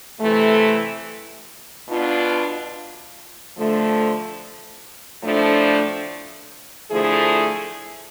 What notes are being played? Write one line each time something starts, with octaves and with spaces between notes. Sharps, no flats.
C3 E3 A3
B2 B3 D4 F4
D3 F3 A3
A2 F3 A3 D4
D3 F3 A3 E4 G#4